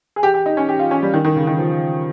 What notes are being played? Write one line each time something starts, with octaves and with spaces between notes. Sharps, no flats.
G#4
G4
G4
D#4
C#4
G4
F4
C#4
G3
D#3
D#3
C#3
D#3
F3